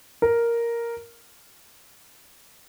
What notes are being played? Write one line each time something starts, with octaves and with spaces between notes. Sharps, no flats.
A#4